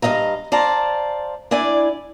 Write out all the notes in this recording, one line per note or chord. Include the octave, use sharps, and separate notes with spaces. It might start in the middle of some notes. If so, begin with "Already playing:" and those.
G2 A3 D#5 F5 A#5
C5 D5 F5 A5 A#5
D4 E4 D5 G#5